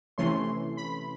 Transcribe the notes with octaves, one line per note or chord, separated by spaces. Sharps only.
C3 E3 A3 C#4 C6
B5